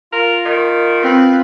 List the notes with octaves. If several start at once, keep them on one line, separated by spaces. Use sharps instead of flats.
F4 A#4
D#3
C4 B4